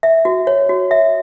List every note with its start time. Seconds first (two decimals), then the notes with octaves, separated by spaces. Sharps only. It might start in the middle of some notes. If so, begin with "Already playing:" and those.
0.03 E5
0.25 F#4
0.47 C#5
0.69 F#4
0.91 E5